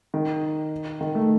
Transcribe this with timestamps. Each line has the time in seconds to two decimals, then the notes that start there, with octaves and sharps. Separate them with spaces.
0.14 D#3
1.01 D#3
1.15 A3